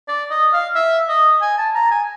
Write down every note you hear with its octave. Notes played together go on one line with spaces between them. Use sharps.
D5
D#5
F5
E5
D#5
G#5
A5
A#5
G#5